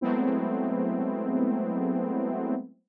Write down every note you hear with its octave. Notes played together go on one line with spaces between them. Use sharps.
F#3 G#3 A3 B3 C4 E4